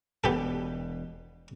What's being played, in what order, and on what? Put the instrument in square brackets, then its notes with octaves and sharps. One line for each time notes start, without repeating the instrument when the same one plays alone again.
[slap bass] E1 B2 [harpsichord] B3 G4 A4